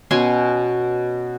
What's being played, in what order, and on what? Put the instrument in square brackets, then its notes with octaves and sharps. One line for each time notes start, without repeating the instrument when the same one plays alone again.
[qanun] B2 C#4 G#5 C6